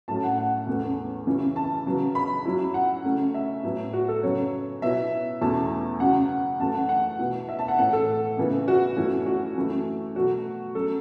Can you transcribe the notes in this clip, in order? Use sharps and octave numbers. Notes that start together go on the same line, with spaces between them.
A2 F#3 A3 C#4 A5
F#5
F#5
E2 E3 A3 C#4
F#2 C#3 E3 C#4 E4
A5
C#3 F#3 B3
B5
F#2 F#3 C#4 E4
F#5
C#3 A3 C#4
E5
A2 F#3 B3 E4
F#4
A4
F#2 C#3 F#3 B3 C#5
B2 B3 E4 E5
E2 B2 A3 C#4 E4 A5
F#2 C#3 F#3 F#5
F#2 E3 A3 A5
F#5
F#5
B2 B3 E4
E5
A5
F#5
A2 E3 A3 F#5
A4
C#3 E3 B3 E4
F#4
F#2 E3 A3 C#4 E4
F#4
F#2 E3 A3 E4
B2 F#3 A3 F#4
F#3 C#4 A4